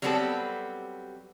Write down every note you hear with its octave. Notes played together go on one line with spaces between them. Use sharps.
F#3 G3 B3 C4 G4 A4